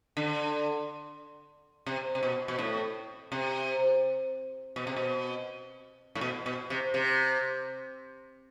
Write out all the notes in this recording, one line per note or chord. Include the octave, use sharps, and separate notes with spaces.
D3
C3
C3
B2
B2
A2
C3
B2
C3
B2
A2
B2
B2
C3
C3